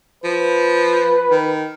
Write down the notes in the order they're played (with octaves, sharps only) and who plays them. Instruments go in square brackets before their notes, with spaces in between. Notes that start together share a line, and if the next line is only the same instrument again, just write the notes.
[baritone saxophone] F3 [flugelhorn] B4
[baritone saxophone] D#3